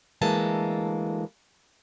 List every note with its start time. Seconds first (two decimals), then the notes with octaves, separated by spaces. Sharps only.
0.22 D2 E3 G#3 A#3 A4 A5